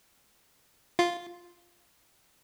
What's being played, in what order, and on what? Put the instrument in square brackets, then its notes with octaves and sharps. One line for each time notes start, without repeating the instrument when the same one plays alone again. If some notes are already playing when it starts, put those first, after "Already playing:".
[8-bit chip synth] F4